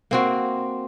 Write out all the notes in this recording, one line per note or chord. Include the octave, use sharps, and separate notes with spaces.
A#3 C4 F#4